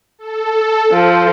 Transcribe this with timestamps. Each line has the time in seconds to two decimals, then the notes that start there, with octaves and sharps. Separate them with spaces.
0.19 A4
0.92 F3 C5